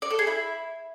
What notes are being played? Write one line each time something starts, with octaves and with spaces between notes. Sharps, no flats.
D5
A4
G#4
E4